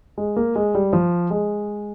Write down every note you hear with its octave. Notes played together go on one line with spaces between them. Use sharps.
G#3
A#3
G#3
G3
F3
G#3